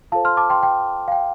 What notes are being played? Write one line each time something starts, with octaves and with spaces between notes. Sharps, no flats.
F4 A4 C5 F5 A5
C6 F6
A5 D6
G5 C6
G5
F5
G5